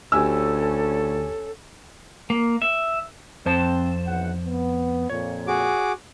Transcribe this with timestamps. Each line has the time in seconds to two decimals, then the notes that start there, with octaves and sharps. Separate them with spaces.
0.12 D2 C#4 G4 A4 C#5 G#5 E6
2.30 A#3
2.62 E5
3.46 F2 C4 C5 A5
4.07 B1 E3 F#5
4.47 B3
5.10 F2 A#2 C#5
5.47 F#4 G#4 D6